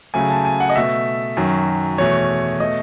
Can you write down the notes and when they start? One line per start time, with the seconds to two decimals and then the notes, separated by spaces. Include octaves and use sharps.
0.14 C#3 F#3 A3 G#5
0.30 A5
0.45 G#5
0.60 F#5
0.70 D#5
0.75 B2 A3 E5
1.37 F#2 D#3 F#3
1.98 E2 B2 A3 C#5
2.60 B2 A3 D#5